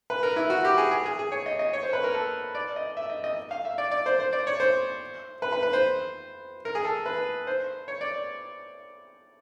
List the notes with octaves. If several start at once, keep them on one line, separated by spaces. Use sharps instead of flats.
B4
A#4
E4
F#4
G4
G#4
G#4
G#4
G#4
C#5
D#5
D#5
C#5
C5
B4
A#4
A4
D5
D#5
E5
D#5
D#5
F5
E5
D5
D5
C5
C5
D5
C#5
C5
B4
B4
B4
C5
A#4
G#4
A4
B4
C5
C#5
D5